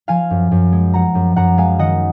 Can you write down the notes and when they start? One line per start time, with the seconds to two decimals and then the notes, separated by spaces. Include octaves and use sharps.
0.08 F3 F5 G#5
0.31 F#2
0.51 F#2
0.72 G#3
0.94 F3 F#5 A#5
1.15 F#2
1.36 F#2 F#5 A#5
1.58 G#3 F5 G#5
1.79 D#3 D#5 F#5